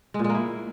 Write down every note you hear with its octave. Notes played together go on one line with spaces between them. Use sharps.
G#3
A#2
G#3
A#3
E4